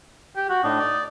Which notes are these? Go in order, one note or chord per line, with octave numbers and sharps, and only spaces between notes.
G4
F#4
A2 D4 D#4
D5